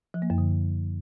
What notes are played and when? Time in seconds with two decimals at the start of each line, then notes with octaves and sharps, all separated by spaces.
0.14 F3
0.22 A#3
0.30 F#2
0.38 D3